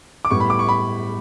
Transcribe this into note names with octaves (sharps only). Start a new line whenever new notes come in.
D6
A2 G3 B3 C#6
B5
D6
C#6
B5